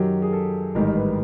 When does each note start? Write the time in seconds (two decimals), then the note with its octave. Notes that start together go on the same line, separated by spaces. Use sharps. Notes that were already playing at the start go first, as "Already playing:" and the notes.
Already playing: F#2 D#3 F#3 G4
0.22 G#4
0.33 A4
0.75 A1 G#2 D#3 G3 A#4
0.95 B4